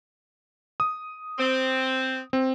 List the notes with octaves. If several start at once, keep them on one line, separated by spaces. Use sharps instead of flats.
D#6
C4
C4